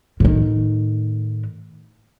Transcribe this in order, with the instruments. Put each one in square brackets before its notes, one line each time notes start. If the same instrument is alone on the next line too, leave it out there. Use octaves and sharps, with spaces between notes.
[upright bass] A2 D#3